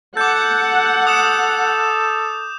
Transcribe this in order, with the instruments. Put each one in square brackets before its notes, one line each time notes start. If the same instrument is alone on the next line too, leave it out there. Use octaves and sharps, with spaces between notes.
[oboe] A4 [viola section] F#5 [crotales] D6 G6
[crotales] D#6 E7